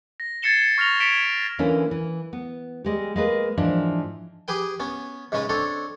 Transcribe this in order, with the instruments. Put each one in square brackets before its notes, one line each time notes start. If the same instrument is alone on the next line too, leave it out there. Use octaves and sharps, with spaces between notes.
[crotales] A#6
G#6 A6 C7 C#7 E7 G7
C#6 F6 A#6 F7 G7
G#6 B6 C#7 D7 E7 G7
[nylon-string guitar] D3 E3 A#3 C#4 E4
E3
B3
G3 G#3 G4
G#3 A#3 B4
G#2 E3 F3 D4
[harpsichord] G4 G#4 B4 G5
B3 C#4
G#2 C#3 G#3 C#4 B4
C4 D4 A4 C#5